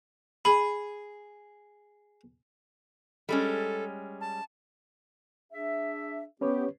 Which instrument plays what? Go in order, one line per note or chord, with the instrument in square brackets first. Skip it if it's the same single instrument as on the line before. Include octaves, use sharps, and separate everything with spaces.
[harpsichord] G#4 [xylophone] B5
[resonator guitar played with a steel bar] G3 G#3 C#4 [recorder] A4
[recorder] A5
[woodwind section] D4 G#4 E5
[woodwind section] B3 G4 [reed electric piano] C#4 B4 C#5